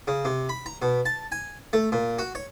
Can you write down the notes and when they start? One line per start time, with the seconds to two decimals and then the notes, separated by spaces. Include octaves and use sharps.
0.07 C#3
0.25 C3
0.49 B5
0.66 A#5
0.82 B2
1.06 A5
1.32 G#5
1.73 A3
1.92 A#2
2.19 F#4
2.35 C#5